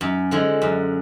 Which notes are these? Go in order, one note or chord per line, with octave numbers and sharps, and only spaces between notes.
F#2
D3 F3 G#3
F#2